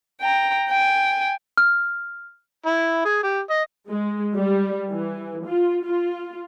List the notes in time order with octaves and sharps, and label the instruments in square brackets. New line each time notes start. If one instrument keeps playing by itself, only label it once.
[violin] G5 A#5
G5 G#5
[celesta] F6
[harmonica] E4
G#4
G4
D#5
[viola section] G#3
G3
E3
F4
F4